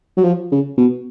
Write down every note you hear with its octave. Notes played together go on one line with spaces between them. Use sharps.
F#3
F3
C#3
B2